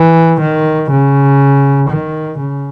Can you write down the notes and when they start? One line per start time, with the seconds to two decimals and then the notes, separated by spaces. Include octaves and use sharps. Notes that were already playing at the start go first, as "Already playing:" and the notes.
Already playing: E3
0.41 D#3
0.91 C#3
1.90 D#3
2.39 C#3